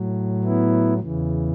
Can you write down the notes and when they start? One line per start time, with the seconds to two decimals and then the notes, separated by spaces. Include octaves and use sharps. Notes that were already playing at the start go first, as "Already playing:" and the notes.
Already playing: A2 F#3
0.44 B3 E4
0.99 E2 C#3 E3